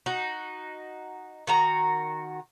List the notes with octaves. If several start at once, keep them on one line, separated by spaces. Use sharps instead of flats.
D#4 F#4
D#3 F#4 A#5